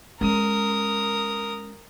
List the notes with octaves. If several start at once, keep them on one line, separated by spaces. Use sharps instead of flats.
G#3 C#4 A#4 D#6